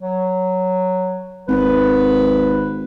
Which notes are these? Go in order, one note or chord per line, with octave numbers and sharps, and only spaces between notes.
F#3
G#1 B4